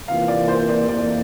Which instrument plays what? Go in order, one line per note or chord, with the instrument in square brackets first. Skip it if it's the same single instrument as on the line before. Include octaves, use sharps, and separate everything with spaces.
[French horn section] C3 E3 A#3 F4 [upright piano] F5
[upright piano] D5
C5
D5
[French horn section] F2 E3 A#3 [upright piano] D5